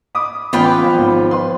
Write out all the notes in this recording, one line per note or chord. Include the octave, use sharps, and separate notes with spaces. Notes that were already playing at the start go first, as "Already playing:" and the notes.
B5 D6 D#6
A1 B3 C#4 F4 B4 G5
D6
F3
G#1 G#2
B4 C6